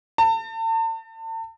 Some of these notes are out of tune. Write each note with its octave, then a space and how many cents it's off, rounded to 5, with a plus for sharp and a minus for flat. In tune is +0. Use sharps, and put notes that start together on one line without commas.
A5 +35